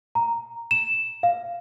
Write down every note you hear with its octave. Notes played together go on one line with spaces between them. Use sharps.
A#5
E7
F5